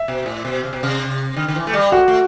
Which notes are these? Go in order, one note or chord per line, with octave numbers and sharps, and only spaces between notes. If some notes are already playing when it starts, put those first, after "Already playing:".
Already playing: E5
B2
A2
B2
C3
B2
C3
D3
D3
E3
A3
G3
A3 F#4
A3